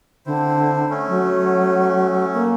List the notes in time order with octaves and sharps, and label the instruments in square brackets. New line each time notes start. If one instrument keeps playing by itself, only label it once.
[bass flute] D3 [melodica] C4 E4 C5
[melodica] A3 C#4
[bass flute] F#3
A#3